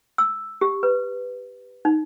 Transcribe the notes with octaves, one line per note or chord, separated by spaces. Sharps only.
E6
G4
B4
D#4